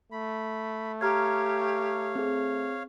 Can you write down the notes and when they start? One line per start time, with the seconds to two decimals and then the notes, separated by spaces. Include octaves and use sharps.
0.12 A3 B5
1.01 G4 C#5 F5 A#5 F6 G#6
2.15 C4 G#4